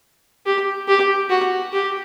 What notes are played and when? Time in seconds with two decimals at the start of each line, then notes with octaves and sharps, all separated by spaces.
0.46 G4
0.88 G4
1.30 F#4
1.73 G4